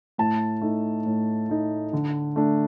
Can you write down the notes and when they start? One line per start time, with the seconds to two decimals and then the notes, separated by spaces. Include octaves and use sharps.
0.18 A2 A5
0.61 A3 D#4
1.06 A2
1.49 A3 D#4
1.93 D3
2.36 A3 D4